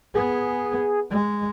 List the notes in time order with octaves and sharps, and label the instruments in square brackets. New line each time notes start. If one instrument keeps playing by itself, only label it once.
[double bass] B3 [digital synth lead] G#4
[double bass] G#3